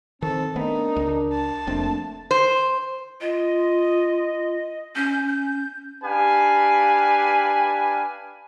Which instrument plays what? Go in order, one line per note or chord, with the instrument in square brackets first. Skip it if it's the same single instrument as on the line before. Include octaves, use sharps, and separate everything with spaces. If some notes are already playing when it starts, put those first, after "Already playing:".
[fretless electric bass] D#3 [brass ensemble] C4 [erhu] A4
[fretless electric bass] A3 B3 C4 [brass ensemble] D4 A#4 [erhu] D#4
[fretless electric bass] C#2
[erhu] A5
[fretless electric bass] F1 F2 C4 [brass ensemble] A3 A#3 D4
[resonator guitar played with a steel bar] C5
[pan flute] F4 [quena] D#5
[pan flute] C#4 [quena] G6
[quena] G6
[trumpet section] D4 G4 B4 F5 G#5